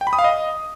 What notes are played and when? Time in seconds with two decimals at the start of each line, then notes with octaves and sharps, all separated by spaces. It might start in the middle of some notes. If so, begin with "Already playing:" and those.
0.01 G5
0.07 B5
0.13 D#6
0.19 F5
0.24 D#5